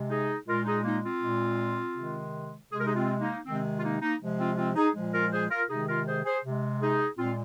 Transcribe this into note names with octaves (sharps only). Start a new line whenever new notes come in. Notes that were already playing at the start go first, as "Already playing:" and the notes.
Already playing: C3 G#3
D#4 G#4
A#2 G#3 F4 A#4
D#4 G#4
A#3 D#4
C4 F4
A#2 G#3
C3 D#3 G#3
C3 G#3 G#4
A#4
D#4 G#4
C4 F4
A#3 D#4
C3 D#3 G#3 C4
F4
A#3 D#4
A#3 D#4
C3 F3 G#3
C4 F4
C4 F4
D#4 G#4
A#2 F3 G#3
F4 A#4
G#4 C5
F4 A#4
C3 D#3 G#3 D#4 G#4
F4 A#4
G#4 C5
G#4 C5
C3 G#3
D#4 G#4
A#2 G#3 C4 F4